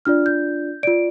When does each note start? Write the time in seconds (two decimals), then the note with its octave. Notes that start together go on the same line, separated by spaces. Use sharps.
0.05 D4 F4 D5 F6
0.26 G6
0.83 F4 D5 D7